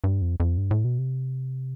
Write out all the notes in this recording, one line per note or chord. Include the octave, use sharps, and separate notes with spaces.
G2
F2
F2
G2
A2
B2
C3